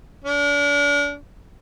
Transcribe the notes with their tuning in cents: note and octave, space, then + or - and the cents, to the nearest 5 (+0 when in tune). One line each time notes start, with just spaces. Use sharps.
D4 -35